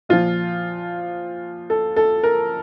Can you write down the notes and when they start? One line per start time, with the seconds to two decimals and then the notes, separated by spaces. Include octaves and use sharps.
0.09 A#2 F3 F4
1.70 A4
1.96 A4
2.23 A#4